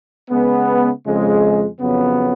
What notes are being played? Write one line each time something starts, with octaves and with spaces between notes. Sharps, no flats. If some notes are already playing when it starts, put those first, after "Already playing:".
C#3 G#3 B3
F2 C#3 G#3
F2 C#3 F#3 B3